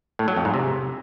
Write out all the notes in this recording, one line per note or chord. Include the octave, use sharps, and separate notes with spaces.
A2
F#3
F2
G#2
C3